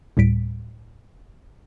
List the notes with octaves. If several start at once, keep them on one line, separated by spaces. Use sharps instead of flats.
D2 A2 G3 B6 D7